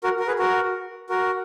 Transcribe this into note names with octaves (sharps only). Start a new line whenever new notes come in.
F#4 A#4
A#4
G#4 B4
F#4 A#4
F#4 A#4